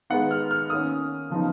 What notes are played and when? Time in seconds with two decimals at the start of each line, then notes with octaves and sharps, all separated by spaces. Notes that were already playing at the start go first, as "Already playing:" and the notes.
0.10 D#3 G#3 B3 D#4 F#5
0.31 F6
0.51 F6
0.70 D#3 A#3 C#4 D#6
1.30 C#3 F3 B3 D#4